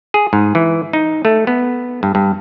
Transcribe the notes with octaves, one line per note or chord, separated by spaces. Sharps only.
G#4
G#2
E3
D#4
A3
B3
G2
G2